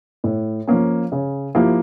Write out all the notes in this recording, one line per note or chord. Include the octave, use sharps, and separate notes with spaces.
A2
F3 A#3 C#4
C#3
F3 A#3 E4 G4